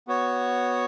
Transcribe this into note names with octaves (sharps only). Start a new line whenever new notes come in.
B3 F#4 C#5